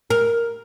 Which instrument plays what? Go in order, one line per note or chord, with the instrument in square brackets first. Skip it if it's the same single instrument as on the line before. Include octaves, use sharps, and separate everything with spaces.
[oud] A#4